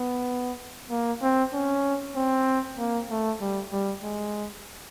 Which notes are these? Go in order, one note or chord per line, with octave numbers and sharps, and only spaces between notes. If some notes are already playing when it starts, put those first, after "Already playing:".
Already playing: B3
A#3
C4
C#4
C4
A#3
A3
G3
G3
G#3